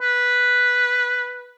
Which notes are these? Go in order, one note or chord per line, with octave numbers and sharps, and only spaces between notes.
B4